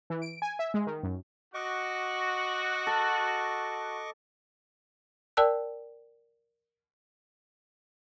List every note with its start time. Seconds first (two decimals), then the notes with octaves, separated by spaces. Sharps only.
0.10 E3
0.22 D7
0.42 G#5
0.59 E5
0.74 G#3
0.87 D#3
1.03 F#2
1.54 F#4 D#5 C#6 D6
2.87 A4
5.37 A#4 D5 G5 A5 E6 F#6